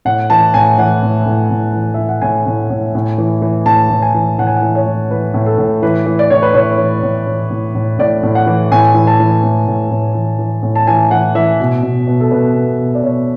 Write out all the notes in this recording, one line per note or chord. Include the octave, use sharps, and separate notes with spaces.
A2 F#5
E3 A5
A2 G#5
E3 F#5
A2
A2
A2
E3
E3 E5
F#5
A2 G#5
A2
A2
A2
E3
E3
A2 A5
A2
G#5
E3
A2 F#5
G#5
F#5
E3
C#5
E3
E3 B4
A2
A4
A2
E3 B4
E3
D5
A2 C#5
B4
A2 C#5
E3
A2
E3
A2
A2
A2 D5
A2
F#5
E3
A2 G#5
E3
A5
E3
A2
A2
A2
E3
E3
A2
A5
E3 G#5
E3 F#5
E3 E5
B2
B2
B2
A4
B2 B4
B2
B2
D5
B2 C#5